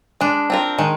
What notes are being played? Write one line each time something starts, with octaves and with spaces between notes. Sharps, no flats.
G#3 D4
C4 F4 A#4
D#3 G#3